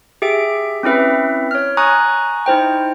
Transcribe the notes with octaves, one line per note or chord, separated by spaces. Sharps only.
G4 G#4 E5 D7
C4 C#4 E4 B4 E5
C#5 F6
G#5 A#5 C#6 D#6 F#6
D#4 E4 C5 G5